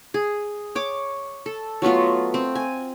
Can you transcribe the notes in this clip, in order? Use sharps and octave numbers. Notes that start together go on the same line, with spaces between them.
G#4
C#5 D6
A4
F#3 A3 B3 F4
C4
G#5